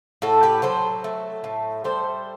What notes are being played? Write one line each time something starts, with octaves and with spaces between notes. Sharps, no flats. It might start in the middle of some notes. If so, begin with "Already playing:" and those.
A2 F#4 A4
G4 B4
F#3 A4 C5
A3
A2
G3 A4 C5